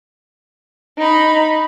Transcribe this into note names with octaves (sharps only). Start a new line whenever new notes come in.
D#4 B5